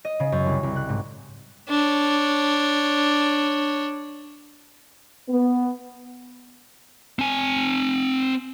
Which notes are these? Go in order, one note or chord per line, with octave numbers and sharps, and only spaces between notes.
D#5
C#3
F#2
C2
C2
F#6
G#2
D4 C#5
B3
C4 G#5